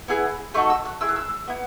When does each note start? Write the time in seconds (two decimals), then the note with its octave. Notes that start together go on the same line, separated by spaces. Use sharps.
0.08 B3 E4 G#4
0.54 A3 D#4 F#4 A4 C#6
0.70 E6
0.85 F#6
1.01 A3 E4 G#4 E6
1.09 F#6
1.16 E6
1.48 B3 E4